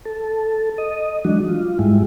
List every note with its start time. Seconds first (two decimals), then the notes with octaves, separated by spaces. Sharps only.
0.05 A4
0.78 D#5
1.25 E3 F#3 G#3 D4 F#4
1.49 F4
1.79 G#2 G3 G#3 E4